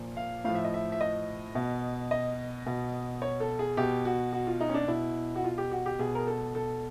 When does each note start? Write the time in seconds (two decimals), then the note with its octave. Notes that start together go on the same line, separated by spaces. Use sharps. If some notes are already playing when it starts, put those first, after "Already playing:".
Already playing: A#2 F3
0.17 F5
0.44 A2 F3 F5
0.55 E5
0.65 D#5
0.74 E5
0.92 E5
1.01 D#5
1.55 B2
2.11 D#5
2.66 B2
3.22 C#5
3.40 A4
3.59 G#4
3.77 B2 G4
4.05 F#4
4.33 F#4
4.47 F4
4.61 D#4
4.69 C#4
4.74 D4
4.88 B2 E4
5.36 F#4
5.44 F4
5.58 G4
5.71 F#4
5.86 G4
5.99 B2 G#4
6.15 A#4
6.27 A4
6.55 A4